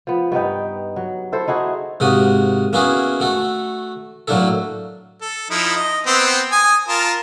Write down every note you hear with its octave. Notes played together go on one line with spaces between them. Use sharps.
F3 B3
G2 B3 D#4 G5
F#3
E4 A4 C5
D#4 E4 F#4 G#4
G#2 C3 A#3 F#4 D#6
A#3 B3 C#4 E4 F#4 G#4
A3 F#4 A4
A2 F#3 A#3 D4 E4 A4
A4
F3 D#4 E4
D#5
B3 C4 G5
G#5 D#6
F4 A#4 A5